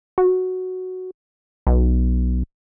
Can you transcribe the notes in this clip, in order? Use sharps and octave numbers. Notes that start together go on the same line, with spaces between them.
F#4
B1